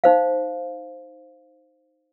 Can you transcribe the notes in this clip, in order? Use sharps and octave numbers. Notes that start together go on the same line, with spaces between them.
D#4 C5 F5